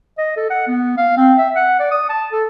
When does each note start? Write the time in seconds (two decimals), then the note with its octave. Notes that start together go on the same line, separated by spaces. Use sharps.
0.18 D#5
0.37 A4
0.50 F#5
0.68 B3
0.97 F5
1.17 C4
1.38 E5
1.55 F#5
1.79 D5
1.91 D#6
2.09 A5
2.32 A4